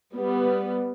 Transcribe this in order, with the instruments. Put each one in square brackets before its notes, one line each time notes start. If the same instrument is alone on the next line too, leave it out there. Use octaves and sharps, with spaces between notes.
[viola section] G3 B3